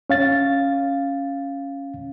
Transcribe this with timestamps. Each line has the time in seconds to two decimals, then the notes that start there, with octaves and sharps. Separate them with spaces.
0.10 C#4 F5 A6